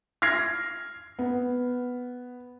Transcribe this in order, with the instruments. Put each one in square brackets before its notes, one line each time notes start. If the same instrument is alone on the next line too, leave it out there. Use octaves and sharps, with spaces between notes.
[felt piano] F6 G#6 A#6 C7
B3